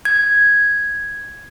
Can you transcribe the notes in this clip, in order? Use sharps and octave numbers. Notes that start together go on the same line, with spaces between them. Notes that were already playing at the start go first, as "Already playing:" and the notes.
G#6